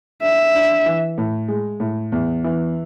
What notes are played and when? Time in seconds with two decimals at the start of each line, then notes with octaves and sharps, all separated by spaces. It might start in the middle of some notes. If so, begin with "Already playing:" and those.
0.22 D4 E5
0.55 D4
0.86 E3
1.18 A2
1.48 G#3
1.80 A2
2.12 E2
2.44 E3